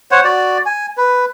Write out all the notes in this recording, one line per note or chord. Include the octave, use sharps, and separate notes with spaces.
C5 C#5 F#5
F#4 D5
G#5
B4